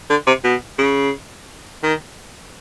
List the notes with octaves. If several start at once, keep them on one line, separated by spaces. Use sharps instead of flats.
D3
C3
B2
C#3
D#3